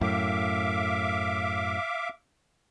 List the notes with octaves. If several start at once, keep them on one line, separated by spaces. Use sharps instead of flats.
F#2 A2 E5 F5 D6